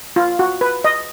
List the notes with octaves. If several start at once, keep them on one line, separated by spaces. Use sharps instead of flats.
F4
F#4
B4
D#5